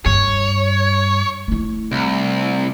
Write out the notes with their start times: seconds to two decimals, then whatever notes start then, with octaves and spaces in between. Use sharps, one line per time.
0.06 G2 C#5
1.48 A3 E4
1.92 C2